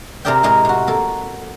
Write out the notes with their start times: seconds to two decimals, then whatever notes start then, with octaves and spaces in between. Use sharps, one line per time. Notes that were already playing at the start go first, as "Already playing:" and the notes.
0.25 C3 G#4 A#4 D5 E5 G5
0.43 A2 C3 G#3 A#4 D#5
0.65 C3 F#4
0.87 A#3 A4